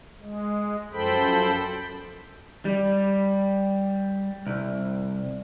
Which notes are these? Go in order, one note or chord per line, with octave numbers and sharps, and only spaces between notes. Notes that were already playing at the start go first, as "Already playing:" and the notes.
G#3
F#2 F3 A4 C5 G5 B5
G3
C2